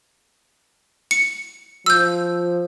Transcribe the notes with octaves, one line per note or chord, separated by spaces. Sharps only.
C#7
F3 E6 G6